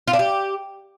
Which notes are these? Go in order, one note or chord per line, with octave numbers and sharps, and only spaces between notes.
F4
D4
G4